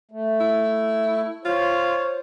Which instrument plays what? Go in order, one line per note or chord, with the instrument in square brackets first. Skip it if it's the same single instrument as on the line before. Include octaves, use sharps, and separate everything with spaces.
[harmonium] A3
[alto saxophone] E4
[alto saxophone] F4 [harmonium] C5 C#5